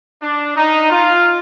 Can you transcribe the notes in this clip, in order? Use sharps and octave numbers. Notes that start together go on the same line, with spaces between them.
D4
D#4
F4